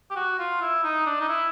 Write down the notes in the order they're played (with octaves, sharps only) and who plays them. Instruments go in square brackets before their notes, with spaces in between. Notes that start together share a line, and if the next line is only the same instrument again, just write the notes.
[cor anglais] G4
F#4
F4
E4
D#4
D4
D#4
E4